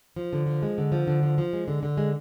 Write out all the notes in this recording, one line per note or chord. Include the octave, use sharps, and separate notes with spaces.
F3
D3
F3
G#3
D3
F3
D3
F3
F3
G#3
D3
D3
G#3